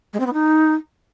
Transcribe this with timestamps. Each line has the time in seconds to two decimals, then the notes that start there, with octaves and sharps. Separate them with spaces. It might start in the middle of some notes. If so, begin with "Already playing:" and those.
0.13 G#3
0.20 C4
0.26 B3
0.33 D#4